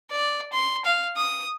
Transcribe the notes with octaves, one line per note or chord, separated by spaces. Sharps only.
D5
C6
F5
D#6